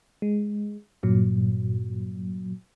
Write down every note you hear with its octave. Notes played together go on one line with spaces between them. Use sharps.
G#3
G2 A#2 F#3